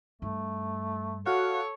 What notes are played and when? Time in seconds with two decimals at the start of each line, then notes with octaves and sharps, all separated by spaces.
0.22 G2 A3
1.26 F#4 A4 C#5 F5 F#5